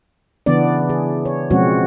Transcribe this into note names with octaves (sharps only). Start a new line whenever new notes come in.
C#3 E3 B3 D4 D5
G#4
C#5
B2 F3 G#3 C4 C#4 F#4